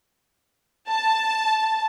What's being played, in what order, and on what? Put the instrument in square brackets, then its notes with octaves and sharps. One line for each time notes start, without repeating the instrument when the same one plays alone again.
[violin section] A5